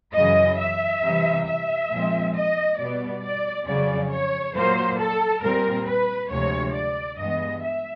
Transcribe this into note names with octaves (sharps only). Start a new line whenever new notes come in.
F#2 C#3 E3 D#5
E5
C3 E3 G3
E5
A#2 F3 G#3 C4
D#5
B2 G3 B3 D5
D5
F2 C#3 F#3 D5
C#5
A#2 F#3 A#3 C5
A4
A#2 G3 C4 A#4
B4
D2 C3 F3 G#3 C#5
D5
G2 E3 G#3 B3 D#5
E5